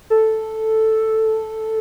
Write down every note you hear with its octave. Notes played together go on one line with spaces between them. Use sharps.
A4